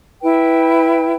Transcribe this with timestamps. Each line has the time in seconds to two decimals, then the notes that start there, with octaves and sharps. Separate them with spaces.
0.22 E4 B4 G5